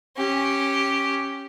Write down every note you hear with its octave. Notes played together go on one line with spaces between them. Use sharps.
C#4 G4